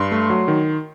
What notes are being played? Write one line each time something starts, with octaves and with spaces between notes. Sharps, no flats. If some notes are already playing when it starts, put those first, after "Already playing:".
Already playing: G2 C6
A3
F#3
D#3